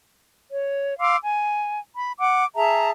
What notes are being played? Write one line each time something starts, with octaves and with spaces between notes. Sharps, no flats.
C#5
F5 C6 D6 E6
G#5
B5
F#5 D6
G#4 E5 A5 A#5